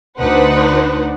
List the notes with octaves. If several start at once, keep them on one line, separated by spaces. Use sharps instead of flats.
D2 D4 D#4 B4 C5 F#5